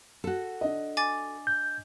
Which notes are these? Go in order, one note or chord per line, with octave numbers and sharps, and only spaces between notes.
F#4 A4
D4 D#5
G#5 D6 A6
G6